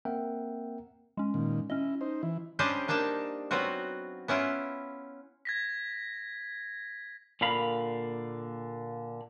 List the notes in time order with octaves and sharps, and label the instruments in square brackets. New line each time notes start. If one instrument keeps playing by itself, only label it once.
[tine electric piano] A#3 C4 A#4 E5 F#5 G5
[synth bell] G#3 C#4
[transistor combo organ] A#2 D#3
[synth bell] C#4 D#5 [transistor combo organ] E4
[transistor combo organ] D#4 C5
E3 E4
[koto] G3 C#4 D4 G4 C5 D#5
A#3 D4 D#4 G5 A5
F#3 B3 C4 F4 F#4
B3 C#4 E4 F4
[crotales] G#6 A#6 B6
[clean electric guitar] A#2 D3 A#3 F5 B5